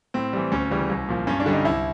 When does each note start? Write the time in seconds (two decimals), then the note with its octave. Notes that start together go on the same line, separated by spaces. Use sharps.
0.14 A2 C4
0.33 E3 G3
0.52 D2 C#4
0.71 C#3 E3 G3
0.89 C2
1.08 A#2 F3
1.27 G2 C#4
1.40 D4
1.46 D3 G3
1.52 D#4
1.65 C2 E4